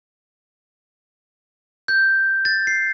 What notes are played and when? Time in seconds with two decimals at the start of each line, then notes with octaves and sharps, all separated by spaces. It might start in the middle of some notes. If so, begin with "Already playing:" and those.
1.88 G6
2.45 A6
2.67 C7